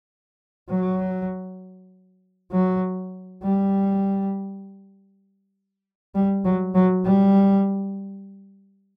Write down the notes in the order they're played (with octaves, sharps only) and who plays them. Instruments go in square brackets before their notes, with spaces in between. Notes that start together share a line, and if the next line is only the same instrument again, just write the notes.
[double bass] F#3
F#3
G3
G3
F#3
F#3
G3